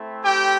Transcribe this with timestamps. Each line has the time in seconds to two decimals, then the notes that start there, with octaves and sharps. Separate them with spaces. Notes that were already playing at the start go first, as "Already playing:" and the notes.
Already playing: A3 C4 E4
0.23 G4 G5